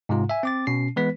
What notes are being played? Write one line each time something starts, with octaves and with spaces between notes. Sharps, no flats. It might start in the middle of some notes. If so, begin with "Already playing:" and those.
G#2 C3 G#3 F4
E5 G#5
C4 D6 A6
B2 C#4 C7
E3 G#3 B3 B4 B6